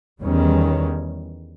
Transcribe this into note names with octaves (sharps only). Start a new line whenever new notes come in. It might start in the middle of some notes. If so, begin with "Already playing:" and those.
E2 D#3 G3 C#4